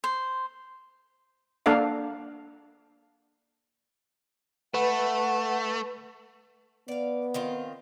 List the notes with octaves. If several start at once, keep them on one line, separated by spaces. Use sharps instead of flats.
C5
A#3 D4 A4 F5 F#5
A3 B4 F#5
B3 D5 F5
D#3 C4 F4